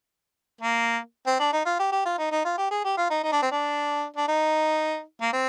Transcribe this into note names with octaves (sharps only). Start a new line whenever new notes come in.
A#3
C4
D4
D#4
F4
G4
G4
F4
D#4
D#4
F4
G4
G#4
G4
F4
D#4
D#4
D4
C4
D4
D4
D#4
A#3
C4